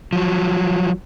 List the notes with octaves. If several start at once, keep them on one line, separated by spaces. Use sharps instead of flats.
F3 F#3